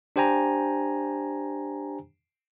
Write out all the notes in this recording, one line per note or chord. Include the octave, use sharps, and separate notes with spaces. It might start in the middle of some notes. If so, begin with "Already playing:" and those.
D4 G4 C5 G5 G#5 A#5